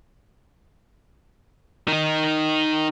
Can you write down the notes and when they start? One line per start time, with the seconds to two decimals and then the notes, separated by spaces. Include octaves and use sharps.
1.88 D#3 D#4